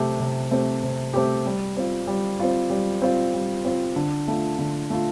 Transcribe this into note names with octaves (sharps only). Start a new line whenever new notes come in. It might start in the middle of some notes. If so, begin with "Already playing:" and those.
Already playing: C3 A3 C4 G4
C3
A3 C4 G4
C3
A3 C4 G4
G3
C4 F4
G3
C4 F4
G3
C4 F4
G3
C4 F4
D3
A3 F4
D3
A3 F4